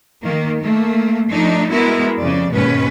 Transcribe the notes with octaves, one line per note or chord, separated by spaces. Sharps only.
D#3 A#3
A3 A#3
F3 A3 D4 D#4
G#3 B3 E4 F#4 A#4
F2 C#3 D5
D#2 G#2 B2 G#3 C#4 B4